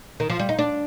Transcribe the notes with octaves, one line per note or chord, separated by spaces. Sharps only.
D#3
F3
G3
D#4
D4